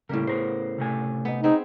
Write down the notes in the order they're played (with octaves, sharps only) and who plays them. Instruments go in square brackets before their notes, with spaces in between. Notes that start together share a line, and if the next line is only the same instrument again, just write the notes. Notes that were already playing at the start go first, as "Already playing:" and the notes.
[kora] A2 A#4 [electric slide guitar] C#3 G3 A#3
[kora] C#3 [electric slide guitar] B3 A#4 C5
[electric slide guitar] C3 A3 G#5
[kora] B3 D#4
[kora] B3 C4 G#4 [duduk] D#4